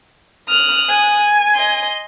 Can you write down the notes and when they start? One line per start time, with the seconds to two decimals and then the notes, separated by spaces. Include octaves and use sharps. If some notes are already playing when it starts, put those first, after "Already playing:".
0.49 D#6 F6 F#6
0.89 G#5
1.55 D#5 C6